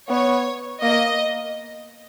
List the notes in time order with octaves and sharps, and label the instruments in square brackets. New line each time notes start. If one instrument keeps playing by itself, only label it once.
[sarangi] B3 [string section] C#5
[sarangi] A#3 [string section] D#5